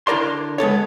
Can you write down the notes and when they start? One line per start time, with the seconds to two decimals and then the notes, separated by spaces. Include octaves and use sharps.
0.07 D3 E4 A#4 D5 C6
0.58 G#3 B3 A4 C#5